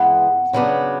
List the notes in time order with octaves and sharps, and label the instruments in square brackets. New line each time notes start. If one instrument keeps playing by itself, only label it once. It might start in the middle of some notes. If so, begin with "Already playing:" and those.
Already playing: [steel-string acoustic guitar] E3 G#3 B3 E4 [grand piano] F#5
[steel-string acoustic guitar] C#3 F#3 B3 D4